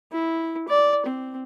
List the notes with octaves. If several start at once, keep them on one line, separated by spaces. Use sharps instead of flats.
E4
D5
C4